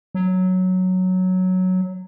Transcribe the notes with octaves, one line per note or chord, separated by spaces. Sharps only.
F#3